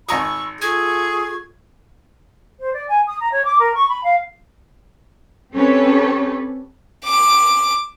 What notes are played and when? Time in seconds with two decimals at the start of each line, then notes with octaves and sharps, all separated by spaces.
0.09 G#1 A#5 B5 C#6 D#6 E6
0.61 F4 G#4 A4 C#6 G#6
2.60 C5
2.73 D5
2.88 G#5
3.07 D#6
3.20 A#5
3.32 C#5
3.45 D6
3.59 A#4
3.74 C#6
3.89 B5
4.04 F5
5.53 C4 C#4 G4 A4 B4 C#5
7.05 D6